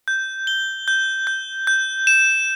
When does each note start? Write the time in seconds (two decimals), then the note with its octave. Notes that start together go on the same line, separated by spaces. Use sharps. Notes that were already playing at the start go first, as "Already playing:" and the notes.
0.08 G6
0.47 G7
0.88 G6
1.27 G6
1.67 G6
2.07 E7